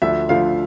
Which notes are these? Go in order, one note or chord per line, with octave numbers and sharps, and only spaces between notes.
D2 D3 F3 E5
D2 D3 F3 F5